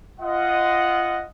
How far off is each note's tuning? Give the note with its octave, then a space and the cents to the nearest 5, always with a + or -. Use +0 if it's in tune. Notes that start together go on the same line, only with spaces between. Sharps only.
F4 -25 D#5 +0 F#5 +0